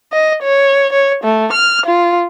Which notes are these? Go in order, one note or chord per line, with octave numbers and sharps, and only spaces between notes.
D#5
C#5
C#5
A3
F6
F4